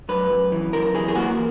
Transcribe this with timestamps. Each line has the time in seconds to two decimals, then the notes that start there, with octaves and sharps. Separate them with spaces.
0.09 F#2 B4
0.30 F#2
0.52 E3
0.73 F#2 A#4
0.95 E3 G#4
1.08 G#4
1.16 A#3 F#4